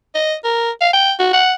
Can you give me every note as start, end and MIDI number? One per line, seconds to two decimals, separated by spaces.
0.15 0.35 75
0.44 0.70 70
0.81 0.90 77
0.94 1.13 79
1.19 1.33 66
1.33 1.53 78